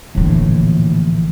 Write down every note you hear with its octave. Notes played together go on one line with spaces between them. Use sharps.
A#1 A2 D3 E3